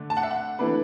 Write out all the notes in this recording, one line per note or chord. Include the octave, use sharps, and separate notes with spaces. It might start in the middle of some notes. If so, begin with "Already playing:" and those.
Already playing: D3 A3 D4
A5
F#5
E5
F#5
E3 A3 D4 B4